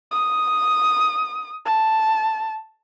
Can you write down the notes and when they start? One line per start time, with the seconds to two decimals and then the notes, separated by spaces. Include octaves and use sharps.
0.12 D#6
1.66 A5